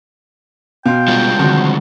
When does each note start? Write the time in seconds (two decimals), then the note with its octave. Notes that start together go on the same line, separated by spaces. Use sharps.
0.86 B2 F5 G5 C6
1.08 G3 G#3 F4
1.39 D3 D#3 F3 C4 F#4